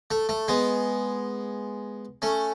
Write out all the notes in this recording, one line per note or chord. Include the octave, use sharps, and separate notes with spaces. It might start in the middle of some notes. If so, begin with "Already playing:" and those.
A3
A3
G#3 B3
A3 C#4